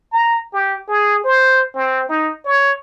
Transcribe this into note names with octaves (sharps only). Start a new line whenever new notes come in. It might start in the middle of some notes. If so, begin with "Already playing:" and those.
A#5
G4
G#4
C5
C4
D#4
C#5